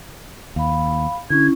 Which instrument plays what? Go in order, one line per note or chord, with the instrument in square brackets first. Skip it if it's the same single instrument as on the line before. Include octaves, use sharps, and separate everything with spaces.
[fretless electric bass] D#2 [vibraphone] F5 B5
[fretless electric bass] D3 [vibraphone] C#4 E4 [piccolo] G#6